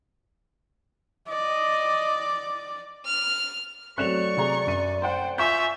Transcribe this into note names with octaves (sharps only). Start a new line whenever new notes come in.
D5 D#5
F6
F#3 A3 C4 D5 C#6 F#6 E7 F7
C3 G#4 A#5
F#2 D#7
C5 F#5 G5 C6
F4 E5 G#5 C#6 G6